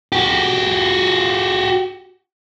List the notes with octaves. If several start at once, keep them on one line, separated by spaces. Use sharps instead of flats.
F#4 G4